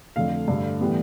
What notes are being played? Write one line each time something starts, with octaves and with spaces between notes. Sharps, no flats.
F2 D3 A3 F5
G2 D3 A3
A2 E3 G3 B3